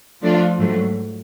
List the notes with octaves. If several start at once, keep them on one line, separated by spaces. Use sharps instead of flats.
F3 A3 D4 F4
G#2 F#3 A3